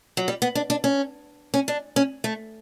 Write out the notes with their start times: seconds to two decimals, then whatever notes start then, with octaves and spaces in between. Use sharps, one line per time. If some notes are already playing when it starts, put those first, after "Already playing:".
0.17 F#3
0.28 G3
0.42 B3
0.55 D4
0.70 D4
0.84 C#4
1.54 C#4
1.68 D4
1.96 C#4
2.24 A3